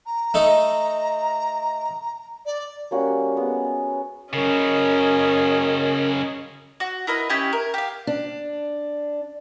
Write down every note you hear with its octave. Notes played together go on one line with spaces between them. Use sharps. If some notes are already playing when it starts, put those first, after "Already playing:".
A#5
A3 D#4 A4
D5
G3 A#3 C#4 F#4
G#3 B3
C#3 F#3 C#4 A#4 D#5
F#4
E4 A#4 B4 D#5
C#4 E4 G4 D#5
A#4
G4 F5
D4